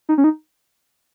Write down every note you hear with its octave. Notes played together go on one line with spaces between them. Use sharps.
D#4
C#4
D#4